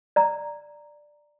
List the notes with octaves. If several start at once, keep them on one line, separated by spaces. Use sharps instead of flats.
D5 A#5